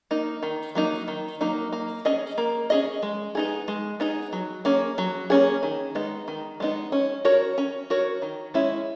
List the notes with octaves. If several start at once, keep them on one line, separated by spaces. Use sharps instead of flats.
A#3 D#4
D#3
F#3 A#3 D#4
D#3
F#3 A#3 D#4
A#3
C#4 G#4 D#5
A#3
C#4 G#4 D#5
G#3
B3 D#4 G#4
G#3
B3 D#4 G#4
F#3
A#3 C#4 G#4
F#3
A#3 C#4 G#4
D#3
G#3 B3 D#4
D#3
G#3 B3 D#4
C#4
F#4 A#4 C#5
C#4
F#4 A#4 C#5
D#3
G#3 C#4 E4